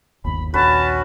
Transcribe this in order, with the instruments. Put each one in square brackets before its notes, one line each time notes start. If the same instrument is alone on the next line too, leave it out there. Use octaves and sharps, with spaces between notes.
[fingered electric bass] G1 D#2 D#3 [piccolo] B5
[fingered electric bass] A#1 D#2 D#3 [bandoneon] C#4 F#4 [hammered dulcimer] B4 [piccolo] A5